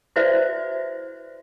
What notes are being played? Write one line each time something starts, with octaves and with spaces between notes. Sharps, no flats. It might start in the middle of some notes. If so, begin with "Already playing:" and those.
E4 F#4 B4 C5 D5 E5